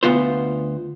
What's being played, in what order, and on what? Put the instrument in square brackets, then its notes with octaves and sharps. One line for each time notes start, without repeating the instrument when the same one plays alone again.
[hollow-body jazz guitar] D2 B2 B3 F4 C5